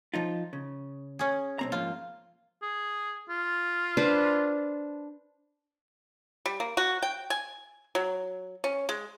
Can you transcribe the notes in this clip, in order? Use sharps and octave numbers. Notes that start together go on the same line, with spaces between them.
F3 D#4 F4
C#3
C#4 G#4
B1 C4 A#5
G#2 F3 A#3 F4
G#4
F4
D4 B4 C5
G3
A#3
F#4
G5
G#5
F#3
C#4
G#3